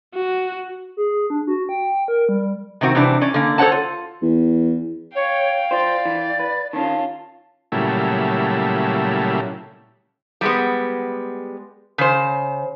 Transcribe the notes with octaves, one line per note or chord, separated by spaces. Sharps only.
F#4
G#4
D4
F#4
G5
A#4
G3
C3 D#3 C4 F#4
C3 E3 G3 C4 D4
C#4 D5
D3 A#3
A4 C5 C#5 F#5 A5
F4
E2
C#5 F5 G5
F4 C5 D5
E3
B4
D#3 C#4 F4 A5
A#2 C#3 F#3 G3 A3 E4
G3 G#3 B3
C#3 C5